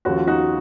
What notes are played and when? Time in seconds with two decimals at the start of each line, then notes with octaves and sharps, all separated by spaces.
0.05 D#2 C#3 F3 F#4
0.16 F4
0.27 D#4 F#4